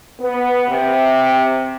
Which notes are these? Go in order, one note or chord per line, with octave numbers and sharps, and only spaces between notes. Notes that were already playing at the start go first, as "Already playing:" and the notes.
B3
C3